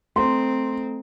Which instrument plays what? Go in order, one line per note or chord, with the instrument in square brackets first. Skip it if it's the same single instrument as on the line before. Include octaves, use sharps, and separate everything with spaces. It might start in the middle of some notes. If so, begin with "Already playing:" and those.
[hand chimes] A3 A4 A#5 [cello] C4 [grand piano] C6